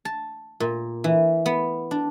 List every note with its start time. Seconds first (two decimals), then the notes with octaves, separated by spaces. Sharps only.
0.05 A5
0.60 A#2
1.04 E3
1.46 B3
1.91 D4